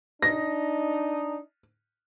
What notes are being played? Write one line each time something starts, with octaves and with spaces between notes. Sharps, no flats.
D4 D#4 A#6